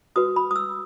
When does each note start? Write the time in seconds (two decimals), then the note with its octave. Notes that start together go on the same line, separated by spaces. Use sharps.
0.16 F#4 B4 D#6
0.36 B5
0.51 D#6
0.56 E6